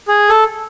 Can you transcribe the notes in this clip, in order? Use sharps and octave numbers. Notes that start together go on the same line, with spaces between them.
G#4
A4